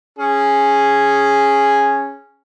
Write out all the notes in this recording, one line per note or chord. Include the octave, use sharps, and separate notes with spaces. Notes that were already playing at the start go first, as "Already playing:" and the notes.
C#4 G#4